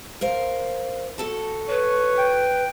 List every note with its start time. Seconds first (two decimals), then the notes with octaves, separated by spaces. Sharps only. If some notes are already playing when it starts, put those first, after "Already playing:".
0.21 A#4 C5 F5
1.18 F#4 A4 A5
1.69 B4 C#5
2.18 G5